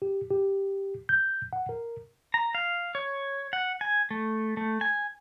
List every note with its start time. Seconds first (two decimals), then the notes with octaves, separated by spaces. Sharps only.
0.02 G4
0.31 G4
1.09 G6
1.53 F#5
1.69 A#4
2.34 A#5
2.55 F5
2.95 C#5
3.53 F#5
3.81 G#5
4.11 A3
4.57 A3
4.81 G#5